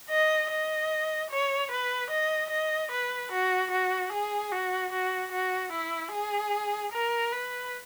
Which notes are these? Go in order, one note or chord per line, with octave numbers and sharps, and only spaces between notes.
D#5
D#5
C#5
B4
D#5
D#5
B4
F#4
F#4
G#4
F#4
F#4
F#4
E4
G#4
A#4
B4